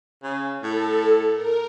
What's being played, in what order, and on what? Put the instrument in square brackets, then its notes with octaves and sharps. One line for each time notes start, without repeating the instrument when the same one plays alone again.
[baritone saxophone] C#3
[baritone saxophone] A2 [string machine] A4
[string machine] A#4